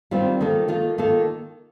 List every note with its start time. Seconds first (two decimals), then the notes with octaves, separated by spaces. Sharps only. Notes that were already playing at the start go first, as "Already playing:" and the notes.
0.11 D#3 G3 C4 F4
0.40 D#3 A#3 F4 A4
0.68 D#3 A#3 F4 A4
0.98 D#3 A#3 F4 A4